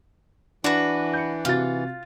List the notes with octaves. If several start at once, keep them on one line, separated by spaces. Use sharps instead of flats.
E3 D4 F#4 B4
G6 C#7
C3 F4 F#4 A6